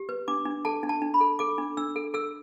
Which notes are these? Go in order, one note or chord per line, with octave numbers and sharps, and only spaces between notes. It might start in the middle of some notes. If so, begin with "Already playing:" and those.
Already playing: G4
B4
D4 D6
D4
A4 A5
D4
A5
D4
B5
A4
A4 D6
D4
D4 E6
A4
A4 E6